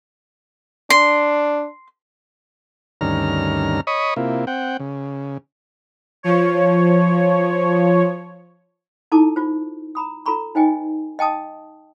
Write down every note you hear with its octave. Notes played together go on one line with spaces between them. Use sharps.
D4 C6
D2 G2 D#3 C#4 A#5 F6
C#5 D#5 B5 C#6 D#6
C3 A#3 E4 F4
C4 F#5 G5
C#3
F3 C#5
D#4 E4 A4 A5 D6
F4 C5
A#5 B5 D#6
F4 A4 A#5 B5 C#6
D#4 C5 D#5 G5 G#5
D#5 G5 A5 D#6